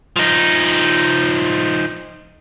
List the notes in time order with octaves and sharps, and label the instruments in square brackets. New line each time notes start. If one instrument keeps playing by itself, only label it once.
[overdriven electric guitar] F3 D#4